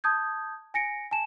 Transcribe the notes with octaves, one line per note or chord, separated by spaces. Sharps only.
A5 D#6 G6 G#6
G#5 A#6 C#7 D7
G#5 A5 E7